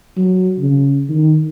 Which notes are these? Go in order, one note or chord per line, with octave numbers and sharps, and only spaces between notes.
F#3
C#3
D#3